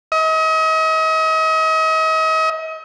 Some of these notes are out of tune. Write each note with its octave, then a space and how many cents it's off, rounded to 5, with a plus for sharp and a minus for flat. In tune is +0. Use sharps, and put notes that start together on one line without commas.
D#5 +40